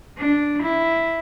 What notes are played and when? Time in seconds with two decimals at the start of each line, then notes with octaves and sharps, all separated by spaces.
0.18 D4
0.63 E4